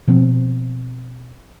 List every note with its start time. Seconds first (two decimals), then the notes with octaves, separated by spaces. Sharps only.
0.07 B2 F3 B3 C4